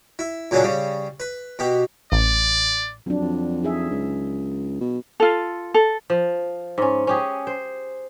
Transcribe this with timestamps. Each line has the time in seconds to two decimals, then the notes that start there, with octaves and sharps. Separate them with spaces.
0.19 E4
0.51 A#2 C#3 F#3 C#4 D4
0.63 C#3 G3
1.20 B4
1.59 B2 G4
2.12 A1 D5
3.06 F2 F#3 D4
3.21 F2
3.63 D#4 G#4 E5
3.90 C#2
4.81 B2
5.20 F4 A4
5.74 A4
6.10 F3
6.78 G#2 C#4
7.07 C#4 G4 G#4
7.47 C5